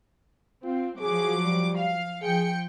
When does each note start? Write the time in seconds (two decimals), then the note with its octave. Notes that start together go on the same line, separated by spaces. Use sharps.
0.64 C4 F4
1.00 F3 F#3 G#4 D6
1.44 G3
1.77 F5
2.22 F3 G#4 G5 C#7